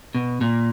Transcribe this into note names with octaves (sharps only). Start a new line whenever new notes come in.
B2
A#2